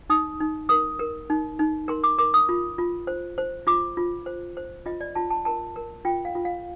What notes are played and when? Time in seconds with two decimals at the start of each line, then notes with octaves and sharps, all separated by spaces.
0.10 D#4 D#6
0.40 D#4
0.69 A#4 D#6
0.99 A#4
1.30 D#4
1.59 D#4
1.88 A#4 C6
2.04 D6
2.18 A#4 D6
2.34 D#6
2.49 F4
2.78 F4
3.07 C5
3.38 C5
3.67 F4 D6
3.97 F4
4.26 C5
4.57 C5
4.86 F4 D#5
5.01 D5
5.15 F4 A5
5.31 A5
5.45 A#4 A5
5.76 A#4
6.05 F4 G5
6.25 F5
6.35 F4
6.45 F5